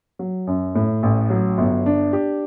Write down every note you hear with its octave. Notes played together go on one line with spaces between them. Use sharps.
F#3
F#2
A2
A1
F#3
G1
D4
G4